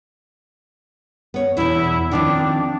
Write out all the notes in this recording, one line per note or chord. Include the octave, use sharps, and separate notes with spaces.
B3 C#5
E2 B2 E4
D#3 F3 C4 D4